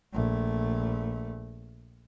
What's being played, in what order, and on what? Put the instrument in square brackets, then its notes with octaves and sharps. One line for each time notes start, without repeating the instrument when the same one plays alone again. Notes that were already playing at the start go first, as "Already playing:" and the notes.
[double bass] A#1 A3